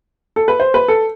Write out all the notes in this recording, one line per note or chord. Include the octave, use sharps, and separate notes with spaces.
A4
B4
C5
B4
A4